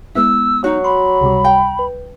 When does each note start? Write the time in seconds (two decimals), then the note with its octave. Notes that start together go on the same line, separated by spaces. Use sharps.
0.15 G#3 B3 E4 E6
0.64 F#3 D#4 F#4
0.84 B5 C6
1.21 C#2 C3 G3
1.44 G5
1.79 B4